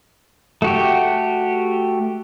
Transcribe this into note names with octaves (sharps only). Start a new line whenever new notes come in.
A3 F#4 G4